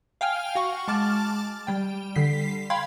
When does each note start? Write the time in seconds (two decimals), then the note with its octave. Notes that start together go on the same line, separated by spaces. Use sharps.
0.21 F5 G5 G#5 F6
0.55 F#4 F#5 C#6
0.88 G#3 A5 D6 F6 A6
1.67 G3 G5
2.16 D3 G3 B6 C7
2.70 F5 G5 B5 C6 G#6